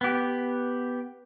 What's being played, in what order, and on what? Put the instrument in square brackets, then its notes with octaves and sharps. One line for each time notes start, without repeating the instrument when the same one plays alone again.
[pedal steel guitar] B3 G4